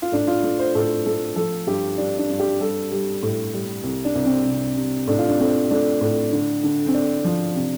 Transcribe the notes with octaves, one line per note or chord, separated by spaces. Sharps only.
F4
A2 D4
F4
A3
C5
A2 A4
A3 A4
F3 A4
G2 G4
G2 D4
D4
G2
G4
G3 A4
G3
A2
G3
C2
D4
C2
C4
C3
C3
A2 D4
F4
D4
A3 C4
A3 D4
A2
D3
D3
C4
D3 D4
F3
C3